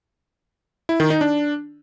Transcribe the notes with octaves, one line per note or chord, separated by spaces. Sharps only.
E4
D#3
D#4
D4